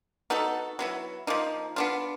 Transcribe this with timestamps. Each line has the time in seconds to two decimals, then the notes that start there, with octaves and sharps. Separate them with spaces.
0.30 B3 D#4 F#4 A4
0.79 F#3 B3 E4
1.27 F3 A#3 D#4
1.76 B3 D4 F4